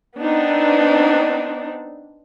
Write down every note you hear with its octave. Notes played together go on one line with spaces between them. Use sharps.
B3 C4 D4 D#4